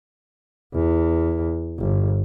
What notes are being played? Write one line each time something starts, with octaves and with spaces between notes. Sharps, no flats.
E2
G1